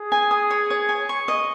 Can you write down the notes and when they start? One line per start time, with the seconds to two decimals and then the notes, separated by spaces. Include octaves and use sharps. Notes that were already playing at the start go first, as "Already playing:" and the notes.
Already playing: G#4
0.12 G#5
0.31 D#6
0.51 C#5
0.70 C#5
0.89 G#5
1.09 C#6
1.28 D#5